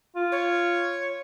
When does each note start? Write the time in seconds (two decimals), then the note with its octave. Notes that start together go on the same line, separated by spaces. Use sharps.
0.16 F4
0.32 C#5